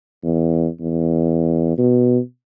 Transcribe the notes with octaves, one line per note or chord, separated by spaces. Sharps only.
E2
E2
B2